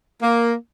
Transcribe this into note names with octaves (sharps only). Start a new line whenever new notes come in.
A#3